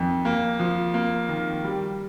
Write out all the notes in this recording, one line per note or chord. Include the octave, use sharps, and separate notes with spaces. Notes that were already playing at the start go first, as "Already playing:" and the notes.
Already playing: F2 D#3
A#3
F3
A#3
D#3
G3